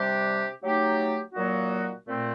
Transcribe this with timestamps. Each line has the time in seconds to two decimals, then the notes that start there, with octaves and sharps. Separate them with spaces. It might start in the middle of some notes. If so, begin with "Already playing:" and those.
Already playing: C3 G3 D4 G4
0.61 F#3 A3 D#4 G4
1.33 A#2 F#3 A#3 D#4 F#4
2.06 A#2 A3 C4